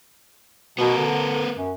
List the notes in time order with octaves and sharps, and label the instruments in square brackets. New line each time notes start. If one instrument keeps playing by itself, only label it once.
[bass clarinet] B2 [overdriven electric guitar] B3 A#4
[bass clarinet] D3
F#2